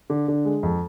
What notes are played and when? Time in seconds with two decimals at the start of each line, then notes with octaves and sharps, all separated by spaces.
0.10 D3
0.28 D3
0.45 G#3
0.63 F2